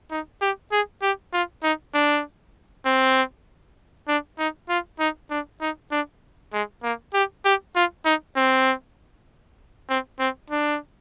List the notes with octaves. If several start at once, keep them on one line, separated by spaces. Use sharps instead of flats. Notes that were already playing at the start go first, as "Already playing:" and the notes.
D#4
G4
G#4
G4
F4
D#4
D4
C4
D4
D#4
F4
D#4
D4
D#4
D4
G#3
A#3
G4
G4
F4
D#4
C4
C4
C4
D4